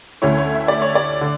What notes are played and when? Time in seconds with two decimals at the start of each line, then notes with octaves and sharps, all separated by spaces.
0.22 D2 D3 A3 C#4 E4 C#5
0.38 C#5
0.55 E5
0.68 D5
0.82 C#5
0.95 D5
1.21 D3